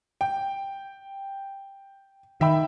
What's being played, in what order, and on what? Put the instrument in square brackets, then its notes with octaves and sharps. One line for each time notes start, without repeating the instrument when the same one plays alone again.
[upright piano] G5
[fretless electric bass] D#3 [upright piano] E5 G5 B5